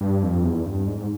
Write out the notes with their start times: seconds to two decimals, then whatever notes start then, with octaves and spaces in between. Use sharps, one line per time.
0.01 G2
0.23 F2
0.44 E2
0.66 G2
0.88 G#2